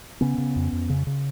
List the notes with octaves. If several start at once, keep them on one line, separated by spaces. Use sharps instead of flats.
C#3 B3 C#4
C#3
F2
F2
C#3
C#3